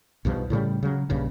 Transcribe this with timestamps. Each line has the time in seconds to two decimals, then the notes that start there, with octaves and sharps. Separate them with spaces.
0.25 B1 G2 B2 F3
0.50 A2 C#3 E3 G3
0.83 C#3 F#3
1.10 A#1 G2 C#3